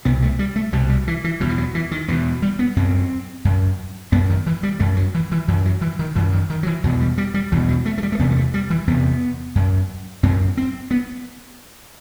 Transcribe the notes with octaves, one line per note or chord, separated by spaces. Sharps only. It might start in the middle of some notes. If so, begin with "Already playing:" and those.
C2 B2 B3
A3
G3
A3
C2 B2 G3
G3
E3
E3
E2 B2 F#3
E3
F#3
E3
D#3
E2 B2 E3
G3
B3
F#2 C4
F#2
F#2 B3
D#3
E3
G3
F#2 A3
F#3
E3
E3
F#2 E3
F#3
E3
D#3
F#2 E3
D#3
D#3
F#3
E3
E2 B2 F#3
G3
G3
G3
E2 B2 E3
F#3
A3
A3
G3
A3
E2 C3 B3
B3
A3
G3
E3
E2 C3 B3
F#2
F#2 C4
C4
B3